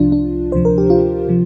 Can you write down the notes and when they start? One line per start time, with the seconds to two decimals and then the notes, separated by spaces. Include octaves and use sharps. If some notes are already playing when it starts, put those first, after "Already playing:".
Already playing: C2 C3 F3 D4 F4
0.12 D4
0.52 D2 C3 F3 C5
0.65 A#4
0.78 G4
0.90 F4
1.28 C3 F3